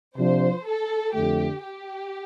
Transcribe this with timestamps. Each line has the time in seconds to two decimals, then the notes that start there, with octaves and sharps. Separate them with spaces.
0.16 C3 F3 D4 C5
0.65 A4
1.14 F2 D3 A3 G4
1.63 G4